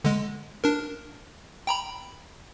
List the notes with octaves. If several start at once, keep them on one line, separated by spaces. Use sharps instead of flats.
D3 G#3
D4 A#4
G5 A#5 B5